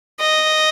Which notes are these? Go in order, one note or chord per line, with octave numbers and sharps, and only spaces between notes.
D#5